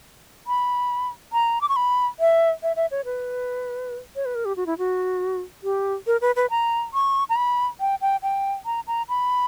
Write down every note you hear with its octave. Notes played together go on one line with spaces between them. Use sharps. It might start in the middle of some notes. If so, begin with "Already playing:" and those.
B5
A#5
D6
C#6
B5
E5
E5
E5
C#5
B4
C#5
B4
A#4
G4
F#4
E4
F#4
G4
A#4
B4
B4
A#5
C#6
A#5
B5
G5
G5
G5
A#5
A#5
B5